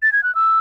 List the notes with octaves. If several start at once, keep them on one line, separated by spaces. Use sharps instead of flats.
A6
G#6
F#6
E6